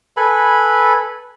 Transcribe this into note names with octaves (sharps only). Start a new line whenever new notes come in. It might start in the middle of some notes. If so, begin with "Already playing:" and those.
A4 B4 G#5 B5